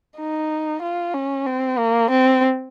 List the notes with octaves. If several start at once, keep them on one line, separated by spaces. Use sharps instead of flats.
D#4
F4
C#4
C4
A#3
C4